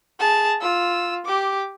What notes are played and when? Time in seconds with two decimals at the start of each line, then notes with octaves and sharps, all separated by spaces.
0.19 G#4 A5
0.60 F4 E6
1.25 G4 D6